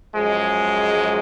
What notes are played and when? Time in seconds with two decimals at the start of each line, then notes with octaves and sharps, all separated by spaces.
0.14 F#2 F3 G#3